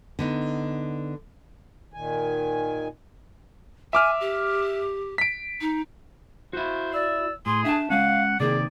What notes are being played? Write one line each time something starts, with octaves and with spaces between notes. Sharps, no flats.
D3 B3 D#4
A#2 D#3 G#5
E5 G#5 D6 F6
G4
B6 D7
D#4
E4 F#4 C5
D5 E6
A2 G#4 C6
D4 E5 F#5 A5
G#3 C#4 F5 F#5
C3 D#3 A#3 G#4 D5